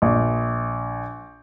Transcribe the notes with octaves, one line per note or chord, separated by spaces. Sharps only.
A#1